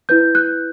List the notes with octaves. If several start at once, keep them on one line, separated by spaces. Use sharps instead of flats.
E4 B4 G6
F#6